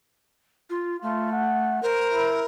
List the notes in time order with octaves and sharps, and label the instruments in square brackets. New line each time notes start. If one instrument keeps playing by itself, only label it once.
[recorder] F4
[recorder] A3 [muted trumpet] F4
[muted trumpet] F#5
[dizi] A#4 [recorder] C5
[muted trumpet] E4